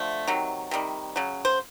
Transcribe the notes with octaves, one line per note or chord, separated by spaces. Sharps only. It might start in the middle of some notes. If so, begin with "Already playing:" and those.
Already playing: D3 F3 A3 E5
C3 D#3 F#3
C3 D#3 G3
C#3 F#3
C5